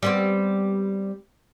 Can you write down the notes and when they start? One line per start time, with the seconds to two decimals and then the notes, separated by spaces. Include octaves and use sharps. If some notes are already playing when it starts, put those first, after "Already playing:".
0.03 G3 B3 C4